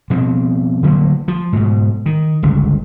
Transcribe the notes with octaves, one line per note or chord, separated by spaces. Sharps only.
B2 F3 C4
D3 F3 F#3 A#3
F3
G#2 B2
D#3
G1 C#2